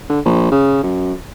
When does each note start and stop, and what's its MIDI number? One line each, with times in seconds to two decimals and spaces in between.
0.09 0.20 50
0.25 0.48 34
0.52 0.82 49
0.83 1.13 42